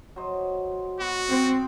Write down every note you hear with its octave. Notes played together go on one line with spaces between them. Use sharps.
F#3 C5 D#5
B3 F#4
C4